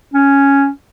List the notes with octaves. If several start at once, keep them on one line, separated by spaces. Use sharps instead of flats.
C#4